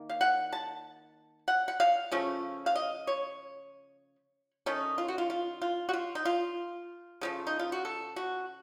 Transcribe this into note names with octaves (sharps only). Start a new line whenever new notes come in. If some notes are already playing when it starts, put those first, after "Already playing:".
Already playing: D#3 A#3
F5
F#5
A5
F#5
F#5
F5
C#3 F3 A3 C#4
F5
D#5
C#5
D#3 A3 C#4 D#4
F4
F#4
F4
F4
F4
F#4
F4
D#4
F4
C#3 F3 A3
D#4
F4
F#4
A4
F#4